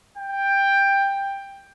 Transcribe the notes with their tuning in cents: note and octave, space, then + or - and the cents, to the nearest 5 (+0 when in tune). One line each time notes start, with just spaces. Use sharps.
G5 +10